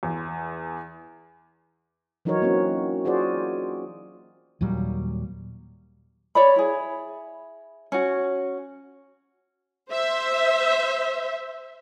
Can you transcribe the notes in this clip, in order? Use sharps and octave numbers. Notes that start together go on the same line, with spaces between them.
E2
E3 F#3 D#4 F#4 A#4 C#5
A#3 C4 C#4 F#4
F4 F#4 G#4 C5 D5
D#2 A#2 F#3 G3
C#5 D5 B5
E4 G#4
C#4 F#4
C5 E5